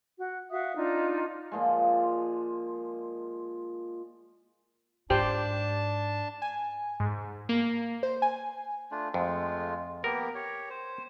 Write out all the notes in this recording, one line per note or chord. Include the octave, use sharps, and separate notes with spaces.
F#4
F#4 E5 F5 D#6
D4 D#4 F4
A#2 F3 G#3
G#2 D4 G4 C5 G5 A5
G#5
G#2
A#3
C5
G#5
A3 D4 F4
F2 G#3 A3 F4
A#3 B3 G4 A#4
G4 C#5
C5